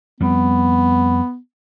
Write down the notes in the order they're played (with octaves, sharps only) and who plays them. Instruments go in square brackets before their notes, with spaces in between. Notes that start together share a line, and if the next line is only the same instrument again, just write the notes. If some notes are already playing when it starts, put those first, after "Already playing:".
[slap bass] F2 G3 [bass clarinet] B3